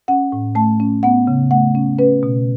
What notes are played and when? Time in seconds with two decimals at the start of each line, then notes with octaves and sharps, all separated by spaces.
0.08 C#4 F#5
0.32 A2
0.55 A3 A5
0.80 C#4
1.03 B3 F#5
1.27 C#3
1.51 A3 F#5
1.75 C#4
1.99 C#4 B4
2.23 B2